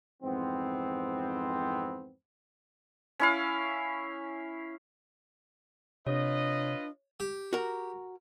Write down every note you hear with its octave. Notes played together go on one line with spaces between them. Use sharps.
F2 G#2 E3 B3 C4
C#4 E4 F5
C3 D4 F4 B4 C#5 D#5
G4
F#4 A#4